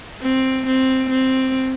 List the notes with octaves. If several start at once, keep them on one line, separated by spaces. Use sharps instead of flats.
C4
C4
C4